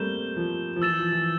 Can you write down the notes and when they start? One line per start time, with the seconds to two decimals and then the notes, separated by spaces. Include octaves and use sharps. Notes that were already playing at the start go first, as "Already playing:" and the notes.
Already playing: G3 A3 A#3 C4 G6 E7 G7
0.37 F3
0.76 F3
0.82 E3 E6 A6 E7
0.99 F3
1.12 E3